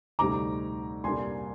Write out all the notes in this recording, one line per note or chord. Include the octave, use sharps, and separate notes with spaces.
D2 C3 G3 C4 D#4 A#5 D6
C2 C3 G3 A#3 D4 G#5 C6